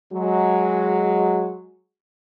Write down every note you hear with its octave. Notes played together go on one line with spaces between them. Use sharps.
F#3 G#3